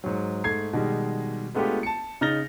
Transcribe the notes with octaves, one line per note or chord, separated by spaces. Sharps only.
G#2 F#3
G#2 A3 G#6 C7
B2 D#3 G3 G#3
G#3 A3 B3 D4 F4 G4
A5 C#7
C#3 D#4 F6 A6 A#6 G7